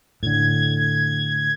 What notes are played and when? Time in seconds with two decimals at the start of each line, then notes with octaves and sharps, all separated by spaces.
0.23 A2 D3 G#6